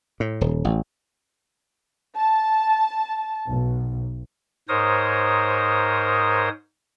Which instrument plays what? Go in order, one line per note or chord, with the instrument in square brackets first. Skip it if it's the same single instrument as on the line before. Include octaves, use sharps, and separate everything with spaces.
[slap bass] A2
D#1
A1
[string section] A5
B1
[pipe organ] G#2 A#4 C5 C#5 D#6